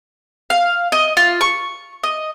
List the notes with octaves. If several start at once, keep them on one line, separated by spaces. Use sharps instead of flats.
F5
D#5
F4
C#6
D#5